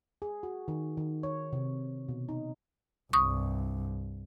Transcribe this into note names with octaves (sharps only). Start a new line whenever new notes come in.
G#4
F#4
D#3
D#3
C#5
C3
B2
D#4
C2 G2 C#6 D#6